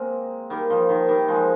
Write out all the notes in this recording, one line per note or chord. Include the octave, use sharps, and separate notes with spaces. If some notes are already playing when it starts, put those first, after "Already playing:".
Already playing: G#3 A#3 C4
D#3 G3
F3
D#3
D#3 G3
F3 G#3